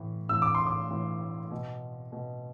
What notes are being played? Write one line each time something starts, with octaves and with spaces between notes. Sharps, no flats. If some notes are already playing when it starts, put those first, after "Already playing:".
Already playing: A2 E3
A2 E3 E6
D6
C6
D6
A2 E3
B2
B2